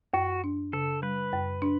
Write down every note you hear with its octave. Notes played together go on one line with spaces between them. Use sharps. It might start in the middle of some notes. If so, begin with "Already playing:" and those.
F#2 F#4
D4
C#3 A4
G3 B4
F#2
D4